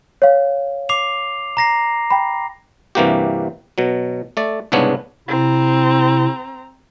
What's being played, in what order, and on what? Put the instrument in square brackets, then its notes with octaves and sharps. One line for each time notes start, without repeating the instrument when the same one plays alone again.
[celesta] C#5 F5
[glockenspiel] D6 C7 F7
A#5 A#6 C7
[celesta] G5 B5
[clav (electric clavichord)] G2 C3 E3 A#3 F#4 G4
B2 F#3
A3 D5
C2 G#2 C#3 B3 D4 C#5
[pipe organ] C3 E4 [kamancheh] C4 A#5